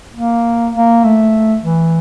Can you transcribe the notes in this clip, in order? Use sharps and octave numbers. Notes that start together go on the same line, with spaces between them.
A#3
A#3
A3
E3